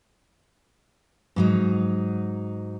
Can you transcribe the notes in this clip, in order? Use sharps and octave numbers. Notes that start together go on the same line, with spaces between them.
G#2 F#3 D#4